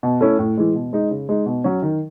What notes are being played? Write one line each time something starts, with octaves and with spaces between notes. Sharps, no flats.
B2
A3 C#4 E4
A2
E3 G#3
B2
G#3 D#4
C#3
G#3 D#4
B2
F#3 C#4
D#3